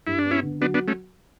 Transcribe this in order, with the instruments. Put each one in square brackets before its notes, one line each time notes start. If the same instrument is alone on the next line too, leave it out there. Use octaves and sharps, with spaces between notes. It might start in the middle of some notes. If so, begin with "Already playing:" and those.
[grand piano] G2 [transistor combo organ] E4
[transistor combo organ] D4
[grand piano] B3
[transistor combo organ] C#4 E4
[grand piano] D3
[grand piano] F#3 [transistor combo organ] B3 D4
[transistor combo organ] B3 D4
A3 C#4